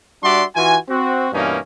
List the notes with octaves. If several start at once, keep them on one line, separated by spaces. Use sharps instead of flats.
G3 D4 F#4 D5 E5 C6
E3 F4 F#4 G#5
C4 F#4
G2 B2 E3 A#3 C#4 D#4